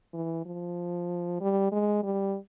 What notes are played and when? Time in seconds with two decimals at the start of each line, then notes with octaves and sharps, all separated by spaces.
0.14 E3
0.46 F3
1.41 G3
1.72 G#3
2.03 G3